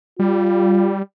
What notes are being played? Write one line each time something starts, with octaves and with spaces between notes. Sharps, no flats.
G3 F4